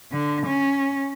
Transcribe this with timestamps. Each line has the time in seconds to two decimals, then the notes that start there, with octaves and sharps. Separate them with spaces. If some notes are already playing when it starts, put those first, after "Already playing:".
0.12 D3
0.47 C#4